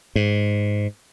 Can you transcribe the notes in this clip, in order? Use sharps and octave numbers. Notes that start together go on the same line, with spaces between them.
G#2